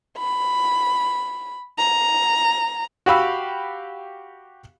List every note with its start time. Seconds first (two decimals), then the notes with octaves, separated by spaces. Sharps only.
0.18 B5
1.78 A#5
3.06 F#4 G4 F5 B5 E6